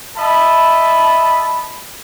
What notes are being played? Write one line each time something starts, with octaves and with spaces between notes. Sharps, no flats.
D#5 E5 A5 B5